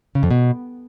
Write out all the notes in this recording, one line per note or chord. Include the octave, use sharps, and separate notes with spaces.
C#3
F2
B2